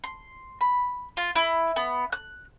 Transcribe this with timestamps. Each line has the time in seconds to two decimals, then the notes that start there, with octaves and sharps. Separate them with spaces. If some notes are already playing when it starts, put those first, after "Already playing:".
0.04 C6
0.61 B5
1.17 F4
1.36 E4
1.76 B3
2.12 F#6